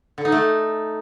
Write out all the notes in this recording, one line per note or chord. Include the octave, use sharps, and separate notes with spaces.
D3
D#4
A3